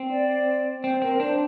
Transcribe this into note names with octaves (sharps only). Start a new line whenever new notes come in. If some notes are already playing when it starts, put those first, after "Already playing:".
Already playing: C4
D5
C4 C5
C4 A#4
D4 C5